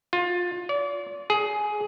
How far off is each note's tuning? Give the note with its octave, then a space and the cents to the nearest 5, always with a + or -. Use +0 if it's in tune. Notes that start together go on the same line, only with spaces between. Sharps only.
F4 +20
D5 -40
G#4 +15